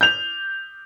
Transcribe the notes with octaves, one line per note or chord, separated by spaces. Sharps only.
G6 F7